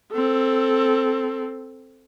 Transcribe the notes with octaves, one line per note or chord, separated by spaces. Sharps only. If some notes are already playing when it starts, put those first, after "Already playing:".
C4 A4